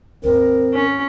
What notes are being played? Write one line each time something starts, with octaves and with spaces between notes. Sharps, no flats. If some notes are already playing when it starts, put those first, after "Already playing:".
D#2 G#2 C4 A#4
C#4